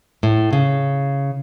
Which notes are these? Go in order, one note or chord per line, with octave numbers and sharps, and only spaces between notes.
A2
C#3